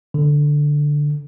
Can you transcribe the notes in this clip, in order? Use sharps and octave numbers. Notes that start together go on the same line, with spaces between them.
D3